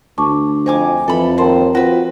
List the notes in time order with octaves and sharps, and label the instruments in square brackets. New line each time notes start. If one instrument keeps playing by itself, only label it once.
[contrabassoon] D2 [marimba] A5 C#6 D6
[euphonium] F2 [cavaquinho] D#4 G#5 D6 [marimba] C5
[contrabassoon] F2 [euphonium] E3 [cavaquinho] A4 B5
[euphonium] D#2 [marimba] A#4 A5 C6 [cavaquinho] C5
[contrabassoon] F3 [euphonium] C4 [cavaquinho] F#4 B4